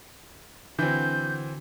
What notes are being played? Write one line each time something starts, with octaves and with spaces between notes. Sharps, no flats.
D3 E3 C4 F#4 G6